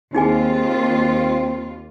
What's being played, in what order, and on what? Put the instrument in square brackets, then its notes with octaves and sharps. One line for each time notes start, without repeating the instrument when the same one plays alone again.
[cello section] D#2 F4 [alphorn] C4 [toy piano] D#4 G#4 G#5